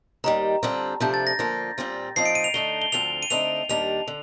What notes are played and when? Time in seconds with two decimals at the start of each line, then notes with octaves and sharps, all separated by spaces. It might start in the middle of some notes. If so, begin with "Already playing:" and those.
0.24 D#2 D#3 G3 A#5
0.63 D3 G3 C4 F4
1.00 C3 F3 A3 D4 G6
1.14 A6
1.27 A#6
1.39 D3 F3 A#3 F4
1.78 A#2 G3 C4 F4
2.16 A#2 F3 C4 D#4 C7
2.26 D7
2.35 D#7
2.44 F7
2.54 D3 A3 D#4 G7
2.82 G7
2.92 D2 D3 F3 C4 F7
3.23 D#7
3.30 D3 A3 C4 D#4 F7
3.69 D#2 D#3 G3 D4 F7
4.08 D3